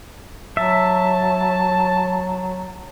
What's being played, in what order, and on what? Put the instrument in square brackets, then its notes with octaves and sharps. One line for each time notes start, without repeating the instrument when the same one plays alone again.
[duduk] F#3 [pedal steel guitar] E5 [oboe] A5